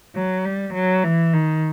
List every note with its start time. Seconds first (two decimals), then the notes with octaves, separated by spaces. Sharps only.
0.15 F#3
0.45 G3
0.74 F#3
1.03 E3
1.33 D#3